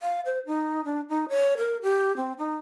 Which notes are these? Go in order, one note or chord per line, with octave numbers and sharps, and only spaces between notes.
F5
C5
D#4
D4
D#4
C#5
A#4
G4
C4
D#4